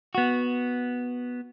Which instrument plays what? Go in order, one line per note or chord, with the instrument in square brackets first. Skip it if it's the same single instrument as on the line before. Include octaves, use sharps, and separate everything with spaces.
[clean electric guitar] B3 F#4